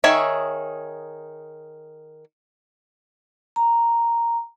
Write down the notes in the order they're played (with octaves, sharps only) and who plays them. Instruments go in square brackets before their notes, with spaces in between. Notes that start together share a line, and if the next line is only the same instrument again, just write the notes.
[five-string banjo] D#3 G#4 C#5 E5
[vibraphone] A#5